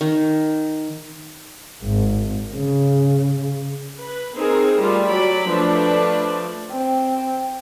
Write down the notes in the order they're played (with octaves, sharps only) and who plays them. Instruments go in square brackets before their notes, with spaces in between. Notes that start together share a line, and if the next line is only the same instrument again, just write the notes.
[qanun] D#3
[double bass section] G#1
C#3
[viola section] B4
C4 D#4 G#4 A#4
G3 A3 F4
F#3 D5 B5
F3 A3 D4 B4 D5
[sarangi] C4